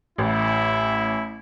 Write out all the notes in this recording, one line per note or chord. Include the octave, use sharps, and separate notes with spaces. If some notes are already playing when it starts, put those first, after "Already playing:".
A1 E4